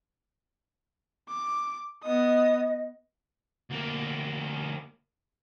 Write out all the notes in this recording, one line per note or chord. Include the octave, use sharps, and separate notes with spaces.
D6
B3 D#5 D#6
D2 A#3